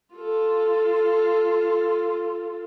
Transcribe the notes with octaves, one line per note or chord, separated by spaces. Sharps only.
F4 A4